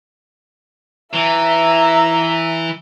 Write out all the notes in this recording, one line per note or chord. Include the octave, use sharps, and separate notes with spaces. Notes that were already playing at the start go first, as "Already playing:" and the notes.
E3 E5 A#5